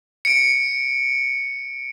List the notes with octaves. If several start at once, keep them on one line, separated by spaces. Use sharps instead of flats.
C#7 D7